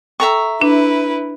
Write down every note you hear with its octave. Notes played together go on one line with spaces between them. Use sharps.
A4 E5 G5 A#5 C#6
D4 E4 B4